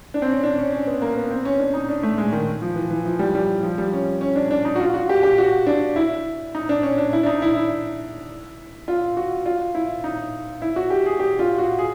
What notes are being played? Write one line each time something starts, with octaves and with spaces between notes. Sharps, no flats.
D4
C4
C#4
D4
C#4
C#4
B3
A#3
B3
C4
C#4
D4
D#4
D4
A3
G#3
D#3
F3
E3
E3
F3
G3
G3
F3
G3
C#4
C#4
D4
D4
D#4
F#4
F4
F#4
G4
G4
F#4
D4
E4
D#4
D4
C#4
D4
E4
D4
D#4
E4
E4
F4
F#4
F4
E4
D#4
E4
F#4
G4
G#4
G4
F4
F#4
G#4